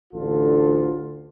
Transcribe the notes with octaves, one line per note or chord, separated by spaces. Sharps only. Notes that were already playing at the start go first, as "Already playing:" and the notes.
A1 D2 D3 F4 A4